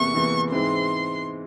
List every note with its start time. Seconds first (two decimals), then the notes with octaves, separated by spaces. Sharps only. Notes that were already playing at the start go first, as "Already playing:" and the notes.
Already playing: E2 C3 E3 A#3 C#6
0.14 E2 C3 E3 A#3
0.52 G#2 E3 G#3 C4 C6